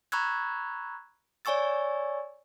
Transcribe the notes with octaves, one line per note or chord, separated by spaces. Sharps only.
A#5 B5 C#6 E6 F#6 G#6
C#5 D5 G#5 C#6 E6 A6